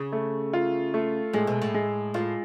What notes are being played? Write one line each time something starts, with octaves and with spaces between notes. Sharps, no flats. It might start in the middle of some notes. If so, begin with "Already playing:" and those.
Already playing: C#3
A3
F4
A3
A2 G#3
B2
A2
G#3
A2 F4